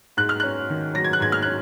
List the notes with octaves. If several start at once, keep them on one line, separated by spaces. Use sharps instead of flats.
G#2 F#6
F6
C#4 F#6
D#3
F#3 A#6
G#6
F#6
G#2 G#6
F6
C#4 F#6